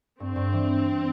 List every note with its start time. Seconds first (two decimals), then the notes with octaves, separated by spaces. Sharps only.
0.20 G2 C4
0.36 G2
0.53 E3